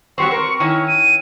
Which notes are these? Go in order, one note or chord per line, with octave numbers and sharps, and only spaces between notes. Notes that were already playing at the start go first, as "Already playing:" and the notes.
F#3 G3 C4 C#6
C4 A#4
D#3 C#4 E4 C#6
D#7